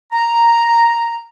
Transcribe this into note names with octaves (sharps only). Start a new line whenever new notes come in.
A#5